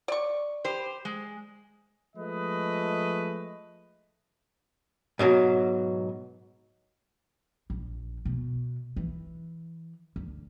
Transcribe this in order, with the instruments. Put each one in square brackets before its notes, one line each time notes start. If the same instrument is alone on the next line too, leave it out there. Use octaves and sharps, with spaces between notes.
[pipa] D5 C#6
[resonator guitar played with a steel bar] G4 C5
G#3
[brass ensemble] F3 G#3 A3 B4 D#5
[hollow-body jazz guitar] G#2 B2 F#3
[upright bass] A#1
B2
E3
D2